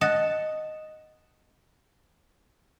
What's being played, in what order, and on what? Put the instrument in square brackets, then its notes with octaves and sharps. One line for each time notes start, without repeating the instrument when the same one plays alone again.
[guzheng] D#5 F#5 A5